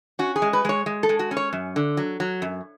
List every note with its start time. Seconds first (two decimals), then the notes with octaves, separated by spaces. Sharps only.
0.19 C#4 F#4
0.36 G#4
0.42 G#3
0.53 B4
0.65 G#3 C#5
0.86 G#3
1.03 A4
1.09 G#3
1.19 F#4
1.31 C#4
1.37 C#5
1.53 F#2
1.76 D3
1.97 F#3
2.20 F#3
2.42 F#2